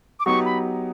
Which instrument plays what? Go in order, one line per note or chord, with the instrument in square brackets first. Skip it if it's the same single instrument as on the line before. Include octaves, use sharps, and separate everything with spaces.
[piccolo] D6
[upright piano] F#3 B3 D#4 G4 [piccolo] C#6
[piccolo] B5